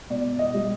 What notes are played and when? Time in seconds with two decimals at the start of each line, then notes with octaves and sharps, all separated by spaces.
0.10 B2 D5
0.39 D#5
0.54 G3